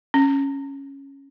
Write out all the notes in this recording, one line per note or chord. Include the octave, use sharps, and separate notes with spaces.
C#4